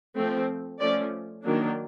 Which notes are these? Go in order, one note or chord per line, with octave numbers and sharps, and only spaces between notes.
F3 A3 C4
F3 A3 C#4 D5
D#3 F#3 A#3 D4